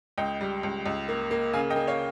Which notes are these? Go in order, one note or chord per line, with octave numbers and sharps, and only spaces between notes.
C#2 D#5 G5
G3
C#2
C#2
A#3
A#3
C#3 F5 G#5
D#5 G5
A#3
C#5 F5